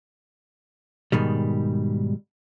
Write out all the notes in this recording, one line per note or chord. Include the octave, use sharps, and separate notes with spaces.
G#2 B2 D#3 G3